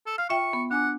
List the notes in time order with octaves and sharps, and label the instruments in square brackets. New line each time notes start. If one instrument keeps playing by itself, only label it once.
[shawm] A4
[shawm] F5 [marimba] F6
[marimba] F4 E5 G5 [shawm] C#6
[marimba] B3
[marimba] D4 G#5 D6 [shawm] F#5